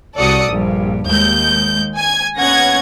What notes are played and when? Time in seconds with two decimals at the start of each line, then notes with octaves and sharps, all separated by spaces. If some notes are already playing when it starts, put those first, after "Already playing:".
0.17 C2 F#4 A4 D5 D#6 C#7
0.49 A#1 G2
1.06 D#2 G#3 G6
1.97 G#5 G#6
2.37 D#2 B3 C#4 F#5 G#6 A#6